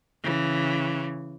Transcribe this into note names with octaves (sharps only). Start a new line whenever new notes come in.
C#3 E3